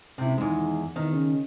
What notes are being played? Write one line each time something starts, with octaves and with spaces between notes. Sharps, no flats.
C#2 C3 E4
E2 D#3 G#3
E2 D#3
C#3